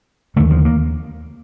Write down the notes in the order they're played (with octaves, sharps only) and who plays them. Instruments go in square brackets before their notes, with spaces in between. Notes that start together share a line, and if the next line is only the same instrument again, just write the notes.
[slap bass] D#2 D3 A3
F3
A#3